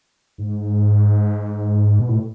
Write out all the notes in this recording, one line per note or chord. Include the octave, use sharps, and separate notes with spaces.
G#2
B2
A2